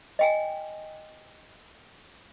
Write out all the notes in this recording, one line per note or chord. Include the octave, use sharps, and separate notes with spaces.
D#5 G5 G#5